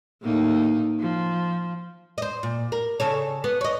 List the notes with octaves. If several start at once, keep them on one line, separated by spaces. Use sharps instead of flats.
A2 A#3 D#4
F3
C5 D#5
A#2
A#4
C#3 A4 C#5
B3
C#5 D#5